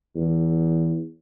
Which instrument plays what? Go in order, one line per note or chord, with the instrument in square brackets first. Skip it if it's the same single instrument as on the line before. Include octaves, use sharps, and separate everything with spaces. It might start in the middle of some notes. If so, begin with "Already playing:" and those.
[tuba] E2